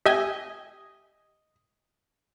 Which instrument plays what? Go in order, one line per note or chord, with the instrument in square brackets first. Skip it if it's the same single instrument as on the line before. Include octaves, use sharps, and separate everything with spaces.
[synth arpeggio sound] G4 E5 G#5 [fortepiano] D#5